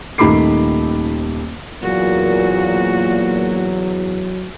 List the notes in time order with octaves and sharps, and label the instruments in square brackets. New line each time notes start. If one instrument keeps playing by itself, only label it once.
[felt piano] D#1 D#3 A3 B5 D6 C7
[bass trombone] E2 [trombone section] A#2 [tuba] F#3 [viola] F#4